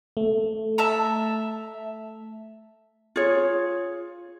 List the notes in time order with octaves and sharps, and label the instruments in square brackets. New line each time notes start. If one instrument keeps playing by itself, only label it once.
[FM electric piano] A3
[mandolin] E5 A5 A#5
[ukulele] F4 G#4 C#5